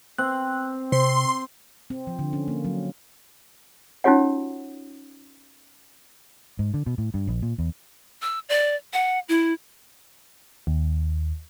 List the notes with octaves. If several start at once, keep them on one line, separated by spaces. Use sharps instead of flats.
C4 F#6
C3 C5 C6
C4
F3
D3
C#4
A#3
F#3
C#4 D#4 F4 F#4 C#5 F#5
G#2
D3
B2
A2
G2
A#1
A#2
E2
E6
D5
F#5
E4
D#2